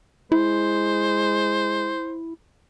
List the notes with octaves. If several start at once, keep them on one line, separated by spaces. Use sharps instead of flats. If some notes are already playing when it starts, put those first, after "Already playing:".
G#3 E4 C5